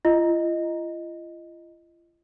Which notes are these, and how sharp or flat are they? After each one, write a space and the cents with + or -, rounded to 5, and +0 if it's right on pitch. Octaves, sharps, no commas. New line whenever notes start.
F4 -40 D#5 +0